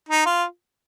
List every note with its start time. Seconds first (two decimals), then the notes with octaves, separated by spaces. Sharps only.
0.09 D#4
0.26 F4